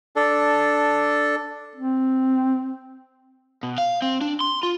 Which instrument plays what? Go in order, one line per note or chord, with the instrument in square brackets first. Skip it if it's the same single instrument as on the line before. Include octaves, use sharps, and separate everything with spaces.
[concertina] D4 A4
[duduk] C4
[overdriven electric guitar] B2
F5
C4
D4
C6
F4